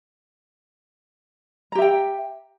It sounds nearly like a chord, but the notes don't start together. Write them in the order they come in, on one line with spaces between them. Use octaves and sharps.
A#5 G4 E5 G5